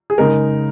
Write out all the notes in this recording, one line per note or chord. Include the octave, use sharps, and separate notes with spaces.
G#4
C#3 G#3 D#4 A#4